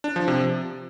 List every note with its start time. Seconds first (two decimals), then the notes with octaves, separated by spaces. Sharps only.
0.04 D4
0.16 F3
0.28 C3